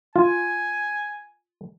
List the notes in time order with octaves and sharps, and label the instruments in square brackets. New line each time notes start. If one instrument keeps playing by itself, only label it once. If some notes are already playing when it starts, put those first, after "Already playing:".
[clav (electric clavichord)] F4 [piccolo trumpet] G#5